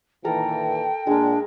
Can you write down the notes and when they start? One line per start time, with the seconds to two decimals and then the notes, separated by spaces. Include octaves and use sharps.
0.25 A#2 D#3 E3 A4 A#4 G5 A#5
1.07 A#2 G#3 D4 A#4